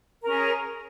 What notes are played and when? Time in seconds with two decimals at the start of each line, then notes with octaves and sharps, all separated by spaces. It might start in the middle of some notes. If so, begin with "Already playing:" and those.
0.23 A#4
0.26 C#4
0.29 G#4